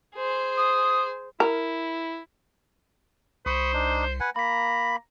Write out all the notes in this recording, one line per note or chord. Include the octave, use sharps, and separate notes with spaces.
G#4 C5
D#6
E4 A#4
C2 C5 B5 C#6 D#6
D4 D#4
B4 F#5 G#5
A#3 A#5 B5 B6